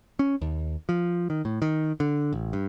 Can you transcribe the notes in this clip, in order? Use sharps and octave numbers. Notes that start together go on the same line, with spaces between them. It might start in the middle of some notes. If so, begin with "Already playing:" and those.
C#4
D#2
F3
D#3
A2
D#3
D3
A1
G2